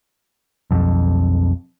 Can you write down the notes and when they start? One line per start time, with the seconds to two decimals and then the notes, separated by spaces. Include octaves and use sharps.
0.71 B1 F2